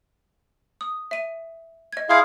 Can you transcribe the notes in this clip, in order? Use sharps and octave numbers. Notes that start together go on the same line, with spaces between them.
D#6
E5 D#7
D#5 G#6
E4 G#4 F5 C6 F6 G#6